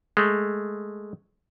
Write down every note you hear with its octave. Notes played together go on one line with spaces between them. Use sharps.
G#3 A3